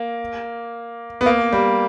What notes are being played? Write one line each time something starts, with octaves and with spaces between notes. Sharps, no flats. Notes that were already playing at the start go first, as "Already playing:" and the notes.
Already playing: A#3
B3
A#3
G3